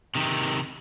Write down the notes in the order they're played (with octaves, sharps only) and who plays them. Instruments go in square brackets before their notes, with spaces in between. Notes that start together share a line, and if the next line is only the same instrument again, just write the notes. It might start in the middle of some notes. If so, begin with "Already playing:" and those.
[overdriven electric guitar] C3 D#3